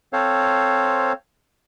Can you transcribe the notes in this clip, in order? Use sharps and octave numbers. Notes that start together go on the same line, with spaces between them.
C4 A4 C5 C#5 F5